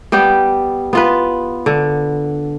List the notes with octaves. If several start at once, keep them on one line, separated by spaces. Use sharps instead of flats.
G3 B3 G4 G5
B3 F4 B4
D3